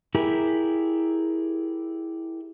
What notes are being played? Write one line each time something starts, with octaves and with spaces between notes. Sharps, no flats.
E4 G4 G#4 A#4